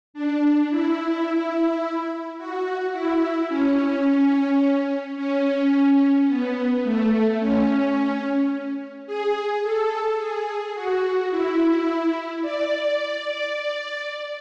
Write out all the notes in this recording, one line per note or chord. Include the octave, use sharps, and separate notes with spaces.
D4
E4
F#4
E4
C#4
C#4
B3
A3
C#4
G#4
A4
G#4
F#4
E4
D5